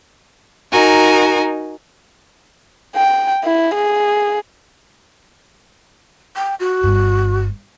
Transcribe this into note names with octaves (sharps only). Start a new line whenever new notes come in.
D#4 F#4 A#4 G#5
G5
E4
G#4
G5
F#4
G1 G2